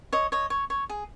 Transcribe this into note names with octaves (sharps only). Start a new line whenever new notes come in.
C#5 D#5
C#5 D#5
C#5
C#5
G#4